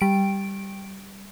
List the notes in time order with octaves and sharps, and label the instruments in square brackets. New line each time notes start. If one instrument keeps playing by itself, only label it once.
[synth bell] G3 D7